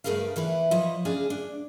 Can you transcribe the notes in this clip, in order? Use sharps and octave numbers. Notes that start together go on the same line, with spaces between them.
G2 A3 G#4 A#4 B4 F5
E2 E3 E4 B4
F3 E4 C#5 D#5
C#3 D4 G#4 F5 G#5
D4